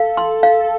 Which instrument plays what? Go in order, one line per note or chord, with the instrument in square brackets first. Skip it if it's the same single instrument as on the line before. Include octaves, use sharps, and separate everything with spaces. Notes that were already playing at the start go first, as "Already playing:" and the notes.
Already playing: [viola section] A4 [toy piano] F5
[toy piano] C6
F5